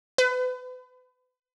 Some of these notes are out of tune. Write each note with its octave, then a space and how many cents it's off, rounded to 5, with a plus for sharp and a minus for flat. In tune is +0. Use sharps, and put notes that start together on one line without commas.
B4 +35